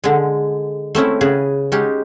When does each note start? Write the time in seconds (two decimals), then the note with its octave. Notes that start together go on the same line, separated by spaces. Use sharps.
0.04 D3 G#3
0.95 A3 C4 C#4 E4
1.21 C#3 G#4 B4
1.72 G#3 C#4 D#4 G4